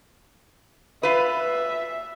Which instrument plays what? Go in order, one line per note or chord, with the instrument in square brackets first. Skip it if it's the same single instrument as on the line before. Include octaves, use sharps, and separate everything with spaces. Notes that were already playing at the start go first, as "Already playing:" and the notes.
[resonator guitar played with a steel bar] F4 B4 [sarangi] E5